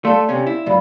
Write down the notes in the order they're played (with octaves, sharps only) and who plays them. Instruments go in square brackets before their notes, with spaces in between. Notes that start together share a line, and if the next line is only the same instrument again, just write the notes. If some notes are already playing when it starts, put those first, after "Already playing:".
[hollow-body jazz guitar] A3 A4 [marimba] D5 F5 C6
[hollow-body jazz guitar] C3 C#4
E4
[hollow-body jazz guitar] C#2 F#2 [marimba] D5 F5 B5